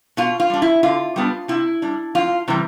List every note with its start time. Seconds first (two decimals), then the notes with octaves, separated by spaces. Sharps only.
0.17 B2 F4
0.40 F4
0.50 G3 D4
0.62 E4
0.83 D3 F4
1.16 G3 B3 D4
1.48 C3 E4
1.82 G3 D4
2.15 F2 F4
2.48 C3 E3 G3